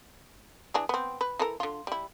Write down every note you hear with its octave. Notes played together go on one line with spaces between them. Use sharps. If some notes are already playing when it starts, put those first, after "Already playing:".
E3 D4 G#4
B3 C4
B4
E3 A4 A#4
D3 F4
G3 E4